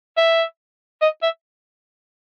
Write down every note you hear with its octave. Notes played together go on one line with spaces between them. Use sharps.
E5
D#5
E5